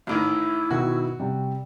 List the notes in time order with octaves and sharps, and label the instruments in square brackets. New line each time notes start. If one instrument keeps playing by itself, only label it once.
[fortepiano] A1 A2 D#3 [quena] E4
[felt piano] B2 D#3 [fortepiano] F#4
[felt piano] C3 G3